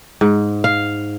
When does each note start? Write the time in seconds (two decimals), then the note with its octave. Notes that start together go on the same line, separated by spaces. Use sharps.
0.21 G#2
0.64 F5